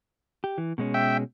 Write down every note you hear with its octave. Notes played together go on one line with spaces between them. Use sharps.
G4
E3
B2 G#3 C#4
E5 G5